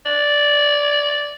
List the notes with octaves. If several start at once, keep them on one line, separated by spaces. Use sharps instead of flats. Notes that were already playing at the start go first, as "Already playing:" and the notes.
D5